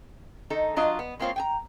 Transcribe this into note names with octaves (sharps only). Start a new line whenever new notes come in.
D#3 D#4 A4
F#3 D4 F4 D#5
B3
G#3 A#3 C4 F4 C5 C#5
G5 G#5 A#5